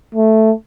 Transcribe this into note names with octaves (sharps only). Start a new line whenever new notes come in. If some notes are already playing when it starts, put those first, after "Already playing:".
A3